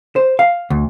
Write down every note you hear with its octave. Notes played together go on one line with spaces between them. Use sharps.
C5
F5
D2